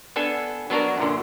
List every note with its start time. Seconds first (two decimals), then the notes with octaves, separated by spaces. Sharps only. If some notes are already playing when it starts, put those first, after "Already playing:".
0.16 B3 D4 A4 G#5
0.70 F#3 B3 D4 F#4 A#4
0.98 F#2 A#2 D3